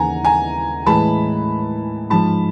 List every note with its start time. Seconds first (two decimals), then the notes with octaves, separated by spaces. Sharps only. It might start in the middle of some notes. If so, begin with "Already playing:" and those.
Already playing: D#2 C#3 E3 F#5 G#5 A#5
0.25 G#5 A#5
0.86 A2 E3 G#3 A5 B5
2.10 G#2 F3 G#3 A5 B5